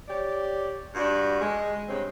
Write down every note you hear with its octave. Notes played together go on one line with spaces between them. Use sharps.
G4 C#5 D5
G2 D4 F#4
G#3
G2 C#3 C4